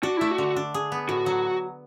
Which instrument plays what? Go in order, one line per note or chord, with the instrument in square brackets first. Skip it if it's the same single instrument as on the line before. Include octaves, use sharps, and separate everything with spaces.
[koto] D4 [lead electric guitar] F#4
[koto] A3 [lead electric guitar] E4
[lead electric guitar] F#4
[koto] D3
D4
G#4
B3
[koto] A2 [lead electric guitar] F#4
[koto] F#3